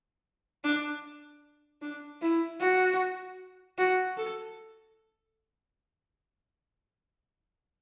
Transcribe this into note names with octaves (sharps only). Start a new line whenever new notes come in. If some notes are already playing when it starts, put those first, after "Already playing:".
D4
D4
E4
F#4
F#4
A4